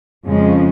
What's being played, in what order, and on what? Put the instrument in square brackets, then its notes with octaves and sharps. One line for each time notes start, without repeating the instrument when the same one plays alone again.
[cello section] F2 C#3 F3 G#3 C#4